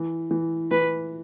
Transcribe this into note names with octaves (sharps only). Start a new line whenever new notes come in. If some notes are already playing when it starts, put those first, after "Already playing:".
Already playing: E3
E3
E3 B4